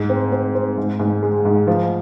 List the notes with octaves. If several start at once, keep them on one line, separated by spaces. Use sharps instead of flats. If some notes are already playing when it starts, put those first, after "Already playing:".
Already playing: G#2
C4
C4
C4
G#2
G#2
G#3
G#2
F3